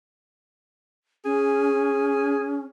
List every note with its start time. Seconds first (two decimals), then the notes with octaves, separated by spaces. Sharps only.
1.25 C#4 G#4